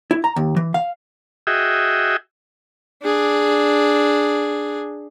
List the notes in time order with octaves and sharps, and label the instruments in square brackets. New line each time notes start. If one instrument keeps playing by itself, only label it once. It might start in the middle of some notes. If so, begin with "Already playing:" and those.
[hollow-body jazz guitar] E4
A#5
D#2
E3
F5
[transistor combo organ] F#4 G#4 D#5 E5 G5
[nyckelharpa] D4 G#4